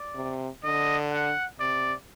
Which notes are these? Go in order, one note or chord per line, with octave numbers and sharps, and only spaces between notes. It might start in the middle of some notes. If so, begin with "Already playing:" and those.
Already playing: D5
C3
D3 D#5
F#5
C3 D5